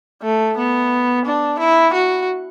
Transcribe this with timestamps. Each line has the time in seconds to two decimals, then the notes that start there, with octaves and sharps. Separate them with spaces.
0.23 A3
0.57 B3
1.25 D4
1.59 E4
1.94 F#4